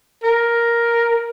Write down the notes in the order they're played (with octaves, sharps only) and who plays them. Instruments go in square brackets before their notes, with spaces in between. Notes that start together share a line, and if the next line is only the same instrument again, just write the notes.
[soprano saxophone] A#4